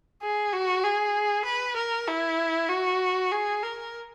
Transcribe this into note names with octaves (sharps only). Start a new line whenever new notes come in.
G#4
F#4
G#4
B4
A#4
E4
F#4
G#4
A#4